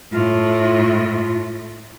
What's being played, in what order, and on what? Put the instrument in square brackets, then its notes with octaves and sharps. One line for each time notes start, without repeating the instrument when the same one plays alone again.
[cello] A2 [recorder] F4